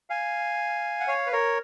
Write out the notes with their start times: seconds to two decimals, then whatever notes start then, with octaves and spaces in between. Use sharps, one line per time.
0.10 F5 G#5
1.00 F#5
1.08 C#5 F5
1.26 B4
1.32 A#4 C#5